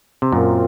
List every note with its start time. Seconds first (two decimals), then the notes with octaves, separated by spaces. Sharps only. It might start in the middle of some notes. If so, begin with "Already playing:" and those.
0.22 C3
0.32 F#2 A#2 F#3 C4 F4 A#4